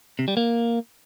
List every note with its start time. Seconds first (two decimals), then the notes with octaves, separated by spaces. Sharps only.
0.19 C3
0.28 G3
0.37 A#3